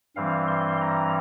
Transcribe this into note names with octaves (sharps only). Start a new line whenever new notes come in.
G2 E3 G3 C4 F5
C6
A#5